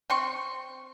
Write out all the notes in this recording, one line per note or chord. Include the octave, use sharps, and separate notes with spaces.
C4 C6 C#6